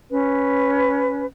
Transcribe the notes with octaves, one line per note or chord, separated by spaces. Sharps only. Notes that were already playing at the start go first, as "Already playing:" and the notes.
C#4 B4